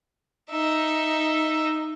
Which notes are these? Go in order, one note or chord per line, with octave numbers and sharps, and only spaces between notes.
D#4 E5